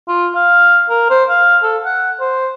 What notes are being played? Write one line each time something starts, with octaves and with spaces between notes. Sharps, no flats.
F4
F5
A#4
C5
F5
A4
F#5
C5